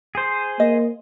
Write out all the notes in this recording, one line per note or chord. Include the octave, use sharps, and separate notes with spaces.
G#4 C5
A#3 D#5